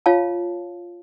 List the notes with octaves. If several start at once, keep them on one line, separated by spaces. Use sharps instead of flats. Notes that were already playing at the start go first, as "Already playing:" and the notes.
F4 C#5 F5 A5